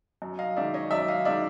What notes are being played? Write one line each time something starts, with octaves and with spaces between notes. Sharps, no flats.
F#2
D#5 F5
D#3 G#3 D5 E5
C#5 D#5
F#2 D5 E5
D#5 F5
D#3 G#3 D5 E5